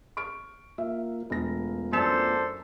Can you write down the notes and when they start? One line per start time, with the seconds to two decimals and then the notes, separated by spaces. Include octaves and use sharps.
0.17 C#6 F6 D7
0.78 A#3 F4 E5
1.30 E1 A3 B3 F4 A#6
1.93 F#2 D4 A4 C5 B6 E7